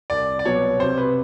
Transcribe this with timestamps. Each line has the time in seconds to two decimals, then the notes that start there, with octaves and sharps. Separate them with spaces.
0.10 C2 D5
0.39 D5
0.45 B2 F#3 B3 C#5
0.79 C3 C5
0.98 B4